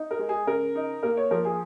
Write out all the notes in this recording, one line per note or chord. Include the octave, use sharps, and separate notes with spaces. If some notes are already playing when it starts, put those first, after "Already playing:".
Already playing: D#4
A#4
G#3
G#4
C#3 A#4
D#4
A#3 A#4
C#5
F3 A#4
G#4